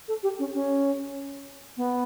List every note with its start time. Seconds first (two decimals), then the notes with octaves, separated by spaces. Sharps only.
0.08 A4
0.23 G4
0.39 C#4
0.54 C#4
1.77 B3